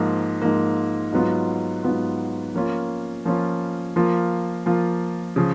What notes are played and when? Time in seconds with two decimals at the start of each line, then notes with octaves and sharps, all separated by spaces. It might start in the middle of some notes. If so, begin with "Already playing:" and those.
Already playing: G#2 F3 A#3
0.42 G#2 F3 A#3
1.12 G#2 F#3 B3 F4
1.83 G#2 F#3 B3 F4
2.54 F3 A#3 C#4 F4
3.25 F3 A#3 C#4 F4
3.96 F3 A#3 F4
4.66 F3 A#3 F4
5.36 C#3 F3